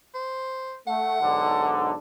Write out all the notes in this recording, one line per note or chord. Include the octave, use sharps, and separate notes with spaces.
C5
A3 F#5
B1 G#2 D3